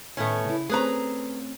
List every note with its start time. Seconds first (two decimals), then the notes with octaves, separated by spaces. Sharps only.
0.17 A2 D#3 A3 B3 C#4
0.45 C#3 E4
0.69 A3 C4 C#4 G#4 B4 A#5